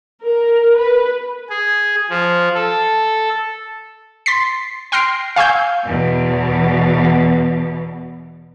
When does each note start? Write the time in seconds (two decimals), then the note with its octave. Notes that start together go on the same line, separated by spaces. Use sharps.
0.25 A#4
0.77 B4
1.49 G#4
2.10 F3
2.54 A4
4.26 C6 A6 B6 C7
4.92 G5 C6 F6 A#6 C7 D7
5.36 F5 G#5 C#6 E6 G6
5.85 E2 B2